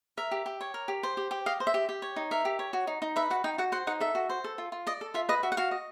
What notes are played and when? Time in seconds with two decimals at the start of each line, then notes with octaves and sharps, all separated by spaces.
0.17 A#4 E5
0.31 G4
0.46 G4
0.61 C#5
0.74 A#4
0.88 G4
1.03 C5
1.17 G4
1.31 G4
1.46 D#5 F5
1.60 C5
1.67 E5
1.74 G4
1.89 G4
2.02 C#5
2.16 D#4
2.31 A#4 E5
2.45 G4
2.59 C#5
2.73 F#4
2.87 D#4
3.02 D#4
3.16 B4 E5
3.30 F#4 F#5
3.44 D#4 G5
3.58 F#4 F#5
3.72 C5 F#5
3.87 D#4 F#5
4.00 A4 E5
4.15 F#4
4.29 C5
4.44 A4
4.58 F4
4.72 F4
4.87 D5 D#5
5.01 A4
5.14 F4 E5
5.29 B4 D#5
5.43 F#4 E5
5.52 F#5
5.57 F#4 F5
5.71 D#5